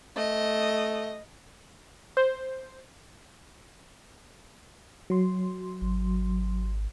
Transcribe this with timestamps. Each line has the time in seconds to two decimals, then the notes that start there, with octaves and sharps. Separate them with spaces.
0.16 A3 D#5
2.17 C5
5.10 F#3 C6
5.82 G#1